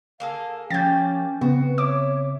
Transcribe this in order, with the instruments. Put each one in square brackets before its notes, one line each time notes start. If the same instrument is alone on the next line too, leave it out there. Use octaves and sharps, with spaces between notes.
[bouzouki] A#3 G#4 A4 [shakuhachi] F5
[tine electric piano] F3 [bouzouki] A#3 G4 [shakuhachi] C#4 [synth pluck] G6 A6
[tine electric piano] C#3 C4 [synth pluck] B3 [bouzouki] F#4 [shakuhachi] B4
[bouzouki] E4 [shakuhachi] C#5 [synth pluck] D6